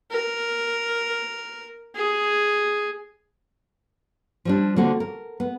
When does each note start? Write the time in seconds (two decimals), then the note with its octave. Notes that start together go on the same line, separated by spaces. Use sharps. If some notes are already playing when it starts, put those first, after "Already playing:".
0.11 A#4
1.95 G#4
4.45 F3 G3 D4
4.76 D3 A#3 C4 F#4
5.00 A#4
5.40 B3